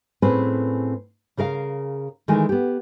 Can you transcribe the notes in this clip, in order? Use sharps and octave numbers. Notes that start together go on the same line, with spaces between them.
A2 C4 C#4 G#4 B4
C#3 G#4 A#4 F5
D#3 E3 G#3 A3 A#4 G#5
B3 G4